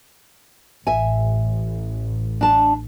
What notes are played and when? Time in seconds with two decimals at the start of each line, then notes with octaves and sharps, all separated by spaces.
0.87 A1 E5 G#5
2.41 D4 A5